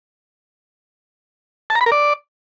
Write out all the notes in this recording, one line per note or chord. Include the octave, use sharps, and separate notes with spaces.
A5
A#5
B5
A#4
D5